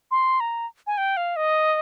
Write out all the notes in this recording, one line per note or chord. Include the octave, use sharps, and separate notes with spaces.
C6
A#5
G#5
G5
F5
D#5